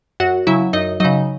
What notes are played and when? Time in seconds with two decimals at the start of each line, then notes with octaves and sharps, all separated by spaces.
0.20 F#2 F#4 F#5
0.47 C#3 F#3 E4 E5
0.73 F#2 D#4 D#5
1.00 C#3 F#3 D#4 D#5